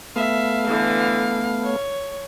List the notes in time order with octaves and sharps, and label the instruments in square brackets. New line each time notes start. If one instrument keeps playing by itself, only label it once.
[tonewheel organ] A3 B3 [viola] E5 [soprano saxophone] F5
[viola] D3 E3
C#5